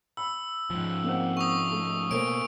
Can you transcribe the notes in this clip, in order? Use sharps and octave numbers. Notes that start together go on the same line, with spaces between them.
B5 E6
G#2 F3
A#3 C4 F#5
C#6 D#6
A3
B2 A#3 A4 A#4 C5 D7